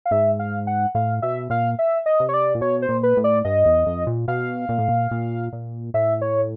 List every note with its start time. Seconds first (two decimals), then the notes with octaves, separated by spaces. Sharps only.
0.05 F5
0.11 G#2 E5
0.39 F5
0.67 F#5
0.95 A2 F5
1.22 B2 E5
1.50 A#2 F5
1.79 E5
2.06 D#5
2.20 C3
2.29 C#5
2.34 D5
2.55 A#2
2.61 B2 C#5
2.82 C5
2.89 A#2
3.03 B4
3.17 A2
3.24 D5
3.45 G2 D#5
3.66 E2
3.86 F2
4.07 A#2
4.28 B2 F5
4.69 A#2
4.78 A2
4.89 A#2
5.11 A#2
5.53 A#2
5.94 A2 E5
6.22 C#5